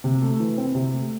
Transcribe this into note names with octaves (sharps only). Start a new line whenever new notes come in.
C3
A3
E3
C4
C3
A3